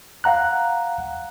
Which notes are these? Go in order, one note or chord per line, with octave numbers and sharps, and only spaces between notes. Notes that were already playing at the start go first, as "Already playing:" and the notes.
F5 F#5 A#5 F#6